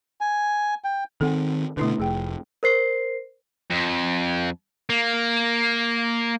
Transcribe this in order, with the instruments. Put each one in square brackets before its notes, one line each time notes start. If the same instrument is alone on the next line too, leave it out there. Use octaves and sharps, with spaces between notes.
[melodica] G#5
G5
[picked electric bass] D#3 C4 [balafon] A4 F#5 G#5
[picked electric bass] B2 D3 [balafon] A3 E4 B4
[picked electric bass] F1 [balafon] G#4 G5
[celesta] A#4 C5 C7
[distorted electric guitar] F2
A#3